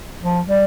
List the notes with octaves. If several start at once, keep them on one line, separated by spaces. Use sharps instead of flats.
F3
G3